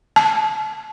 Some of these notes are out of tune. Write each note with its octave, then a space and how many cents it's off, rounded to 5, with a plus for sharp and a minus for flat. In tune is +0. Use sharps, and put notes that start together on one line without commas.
A5 -30